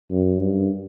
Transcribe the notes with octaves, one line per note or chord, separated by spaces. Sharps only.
F#2
G2